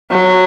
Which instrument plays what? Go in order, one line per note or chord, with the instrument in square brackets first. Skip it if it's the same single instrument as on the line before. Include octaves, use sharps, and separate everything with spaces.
[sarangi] F#3